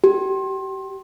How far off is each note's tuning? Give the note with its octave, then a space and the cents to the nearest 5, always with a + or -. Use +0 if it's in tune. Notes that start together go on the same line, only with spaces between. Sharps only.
G4 -30